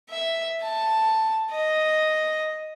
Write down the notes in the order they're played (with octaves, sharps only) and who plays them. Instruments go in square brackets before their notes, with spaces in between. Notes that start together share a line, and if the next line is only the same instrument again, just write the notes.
[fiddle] E5
A5
D#5